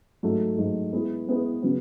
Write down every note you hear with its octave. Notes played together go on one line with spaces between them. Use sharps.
G#2 F#3 A3
G#2 F#3 A3
G#3 B3 E4 G#4 B4
G#3 B3 E4 G#4 B4
C#3 F#3 B3